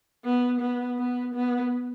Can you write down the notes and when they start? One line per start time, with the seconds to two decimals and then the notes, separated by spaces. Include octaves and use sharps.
0.25 B3
0.61 B3
0.98 B3
1.35 B3